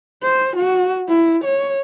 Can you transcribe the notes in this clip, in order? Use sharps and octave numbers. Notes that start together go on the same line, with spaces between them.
C5
F#4
E4
C#5